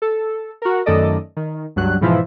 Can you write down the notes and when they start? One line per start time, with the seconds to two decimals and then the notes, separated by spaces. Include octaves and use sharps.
0.02 A4
0.62 F#4 A#4
0.86 F#2 D#3 A3 A4 D5 D#5
1.37 D#3
1.76 C#2 G2 F#3 F#6
2.01 G#2 B2 E3 F3 E4 F4